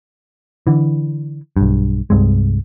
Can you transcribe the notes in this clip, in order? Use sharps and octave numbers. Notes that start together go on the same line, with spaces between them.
D3 E3
B1 G2
C2 G2 C3 G#3